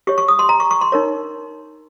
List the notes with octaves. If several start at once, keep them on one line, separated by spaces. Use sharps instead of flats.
G4 C#5 C#6
C#6
D#6
C6
A#5
C#6
C#6
C6
D#4 A#4 C#5